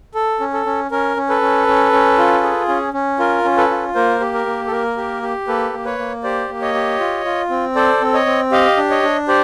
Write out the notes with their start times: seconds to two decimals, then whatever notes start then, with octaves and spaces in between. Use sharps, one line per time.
0.15 A4
0.40 C#4
0.53 A4
0.66 C#4
0.91 C#4 A#4
1.17 C#4
1.29 A4 B4
1.41 C#4
1.67 C#4
1.92 C#4
2.18 F4
2.43 G#4
2.68 C#4
2.94 C#4
3.19 F4 A#4
3.45 C#4
3.57 A4 B4
3.71 F4
3.95 A#3 A#4 C5
4.20 G4
4.34 A#4
4.46 A#3
4.67 A4
4.71 A#3 A#4
4.97 G4
5.22 G4
5.47 A#3 A4 B4
5.73 A#3
5.85 B4 C#5
5.98 A#3
6.23 G4 C5 D5
6.50 A#3
6.61 C#5 D#5
6.74 G4
6.99 F4
7.25 F4
7.50 C4
7.75 A4 C5 D5
8.01 C4
8.14 C#5 D#5
8.26 C4
8.52 G4 D#5 F5
8.77 D4
8.90 C#5 D#5
9.03 D4
9.28 G4 C5 D5